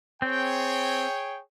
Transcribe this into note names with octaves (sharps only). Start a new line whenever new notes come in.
C4 G#4 C#5 G5